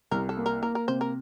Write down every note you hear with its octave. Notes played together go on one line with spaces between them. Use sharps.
C2 A#4
A4
A#3
A#4
A#3 A#4
A#4
C3 C5
A#4